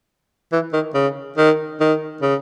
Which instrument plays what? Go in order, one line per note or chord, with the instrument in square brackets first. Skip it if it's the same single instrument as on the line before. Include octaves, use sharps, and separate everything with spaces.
[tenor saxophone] E3
D#3
C#3
D#3
D#3
C#3